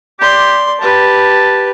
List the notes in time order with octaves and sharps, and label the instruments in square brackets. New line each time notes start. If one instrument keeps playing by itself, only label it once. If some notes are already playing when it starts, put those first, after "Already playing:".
[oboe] G4 [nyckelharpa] D5 C6
[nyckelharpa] G4 B4 [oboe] A5